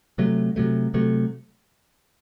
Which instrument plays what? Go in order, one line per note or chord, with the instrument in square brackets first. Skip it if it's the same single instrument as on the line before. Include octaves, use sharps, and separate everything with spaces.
[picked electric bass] C3 F#3 A3
C3 F#3 A3
C3 F#3 A3